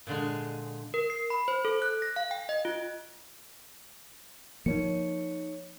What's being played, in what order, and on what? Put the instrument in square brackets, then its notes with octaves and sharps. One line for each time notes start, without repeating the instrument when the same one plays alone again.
[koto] A#2 D3 G#3
[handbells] A#4
C7
B5
C5
A4
F#6
A#6
F5
G5
D#5
F4
[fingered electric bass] F3 A#3 [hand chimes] D#4 C#5 C#7